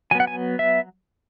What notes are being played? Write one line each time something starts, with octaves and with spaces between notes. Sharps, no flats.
F#3 B3 G#5
F#5
G#5
E5